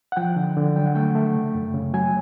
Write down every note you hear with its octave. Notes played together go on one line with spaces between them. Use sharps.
F#5
F3 G5
D3
D3
F#3 G5
F#5
A3 G5
A3
C#3
F#2
C#3
F#3 G#5